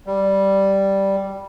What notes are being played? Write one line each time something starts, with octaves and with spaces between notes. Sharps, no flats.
G3